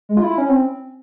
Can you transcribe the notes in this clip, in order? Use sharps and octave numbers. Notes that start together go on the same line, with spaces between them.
G#3
F4
E4
C#4
C4